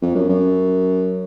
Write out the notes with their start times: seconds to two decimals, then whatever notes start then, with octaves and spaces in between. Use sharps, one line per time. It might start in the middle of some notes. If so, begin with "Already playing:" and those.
0.02 F2
0.15 F#2
0.29 F#2